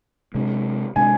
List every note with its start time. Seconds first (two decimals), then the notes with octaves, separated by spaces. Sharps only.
0.35 C3 G#3 D4
0.96 C3 G#3 D4 G#5